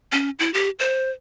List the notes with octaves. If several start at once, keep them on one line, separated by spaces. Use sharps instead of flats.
C#4
E4
G4
C5